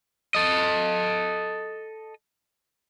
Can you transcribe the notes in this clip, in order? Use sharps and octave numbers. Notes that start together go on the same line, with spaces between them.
A4 D#5